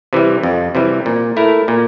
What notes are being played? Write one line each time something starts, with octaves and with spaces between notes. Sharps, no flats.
C3 E3 G3
F2
C3 E3 G3
A#2
A3 E4 A#4
A#2